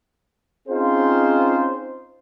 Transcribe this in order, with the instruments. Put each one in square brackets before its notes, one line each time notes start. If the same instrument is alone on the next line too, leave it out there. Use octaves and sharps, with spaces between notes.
[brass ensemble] C4 C#4 D#4 F4 G#4 C5